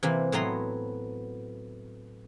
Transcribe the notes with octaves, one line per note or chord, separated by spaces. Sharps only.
C3 E3 A#3
A2 F#3 B3 C4 A#5 C6